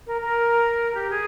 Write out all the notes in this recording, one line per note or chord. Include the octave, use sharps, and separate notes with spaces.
A#4
A#4
G4
G#4